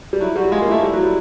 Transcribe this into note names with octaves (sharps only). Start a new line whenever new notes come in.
G3
F#3 E4
G3 F#4
G#3 F4
A#3
A3 E4
G3
F#3
G3